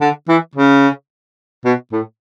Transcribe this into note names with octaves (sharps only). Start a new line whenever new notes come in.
D3
E3
C#3
B2
A2